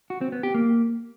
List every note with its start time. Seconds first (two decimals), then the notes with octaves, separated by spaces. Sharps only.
0.10 F#4
0.21 C4
0.32 B3
0.43 G4
0.54 A#3